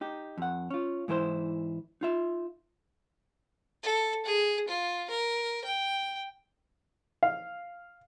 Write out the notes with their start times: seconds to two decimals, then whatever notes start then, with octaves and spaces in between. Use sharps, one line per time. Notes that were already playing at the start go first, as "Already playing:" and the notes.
0.01 D#4 G4
0.38 F2 F#5
0.70 C#4 F4
1.08 G#2 E3 E4 A#4 C5
2.01 D#4 F4 E5
3.83 A4
4.25 G#4
4.68 F4
5.10 A#4
5.64 G5
7.23 F5